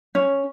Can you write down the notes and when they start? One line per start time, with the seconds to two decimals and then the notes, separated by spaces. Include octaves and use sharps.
0.15 C#4